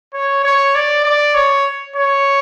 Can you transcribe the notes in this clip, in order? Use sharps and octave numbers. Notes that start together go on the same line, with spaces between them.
C#5
C#5
D5
D5
C#5
C#5